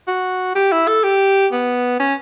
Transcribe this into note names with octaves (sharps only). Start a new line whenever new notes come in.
F#4
G4
E4
A4
G4
B3
C#4